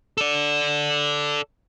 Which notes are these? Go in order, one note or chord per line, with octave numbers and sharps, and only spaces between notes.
A4 D5